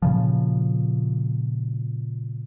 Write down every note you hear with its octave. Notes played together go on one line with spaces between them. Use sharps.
A#2 C#3 F3